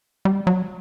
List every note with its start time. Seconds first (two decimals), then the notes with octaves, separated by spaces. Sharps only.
0.25 G3
0.47 F#3